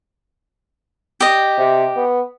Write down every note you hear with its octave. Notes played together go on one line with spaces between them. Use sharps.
G4 D#5
C3
B3